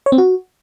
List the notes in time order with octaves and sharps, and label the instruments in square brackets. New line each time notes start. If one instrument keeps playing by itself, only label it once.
[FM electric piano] C#5
C4
F#4